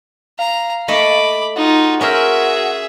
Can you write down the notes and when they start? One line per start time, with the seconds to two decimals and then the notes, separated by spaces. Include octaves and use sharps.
0.39 F5 A#5
0.88 A3 D#5 A5 B5 D6
1.56 D#4 F4 F#4
2.01 C#4 G#4 A#4 C5 E5